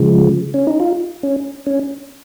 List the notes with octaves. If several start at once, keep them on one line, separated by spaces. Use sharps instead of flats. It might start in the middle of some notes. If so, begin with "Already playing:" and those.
Already playing: C#3 F3 G#3
C#4
D#4
F4
C#4
C#4